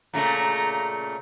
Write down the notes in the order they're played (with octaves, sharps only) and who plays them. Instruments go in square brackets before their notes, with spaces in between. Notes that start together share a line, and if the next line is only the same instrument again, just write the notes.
[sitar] A#2 C#3 A3 [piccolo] A#5